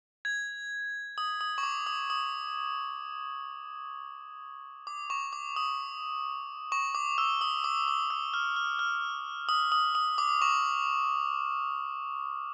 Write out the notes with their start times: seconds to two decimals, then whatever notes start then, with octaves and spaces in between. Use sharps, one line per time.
0.25 G#6
1.18 D#6
1.41 D#6
1.58 C#6
1.63 D6
1.87 D#6
2.10 D#6
4.87 D6
5.10 C#6
5.33 D6
5.56 D#6
6.72 C#6
6.95 D6
7.18 E6
7.41 D#6
7.64 D6
7.88 D6
8.10 E6
8.34 F6
8.56 F6
8.79 F6
9.49 D#6
9.72 D#6
9.95 D#6
10.18 D6
10.42 C#6